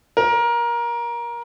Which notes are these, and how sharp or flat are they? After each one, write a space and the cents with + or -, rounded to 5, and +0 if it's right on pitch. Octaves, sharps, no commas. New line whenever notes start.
A#4 +20